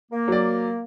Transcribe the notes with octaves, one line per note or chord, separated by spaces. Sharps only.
A#3
F#3 D5